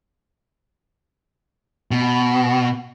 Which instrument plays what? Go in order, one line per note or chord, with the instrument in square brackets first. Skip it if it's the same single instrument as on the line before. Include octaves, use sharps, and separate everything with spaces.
[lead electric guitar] B2